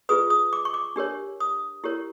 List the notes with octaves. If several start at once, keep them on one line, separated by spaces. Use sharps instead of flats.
F4 G#4 B4 D#6
D#6
D6
C#6
D6
D4 G4 A#4 C#5
D#6
E4 G4 A#4 C#5